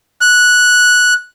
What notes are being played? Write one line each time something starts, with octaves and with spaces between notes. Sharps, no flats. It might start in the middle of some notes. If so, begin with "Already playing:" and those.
F#6